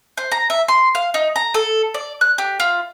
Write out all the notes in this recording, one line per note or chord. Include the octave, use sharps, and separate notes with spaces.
C5
A#5
E5
C6
F5
D#4
A#5
A4
D5
F#6
G4
F4